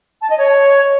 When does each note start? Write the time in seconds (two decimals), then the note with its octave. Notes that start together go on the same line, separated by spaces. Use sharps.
0.22 A5
0.30 D#5
0.38 C#5